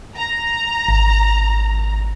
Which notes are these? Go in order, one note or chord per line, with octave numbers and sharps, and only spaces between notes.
A#5
G#1